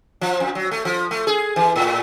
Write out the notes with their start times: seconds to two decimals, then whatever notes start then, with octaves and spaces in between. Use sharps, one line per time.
0.21 F3
0.40 F2
0.55 F#3
0.71 A3
0.85 F3
1.11 A3
1.27 G#4
1.56 E3
1.76 A2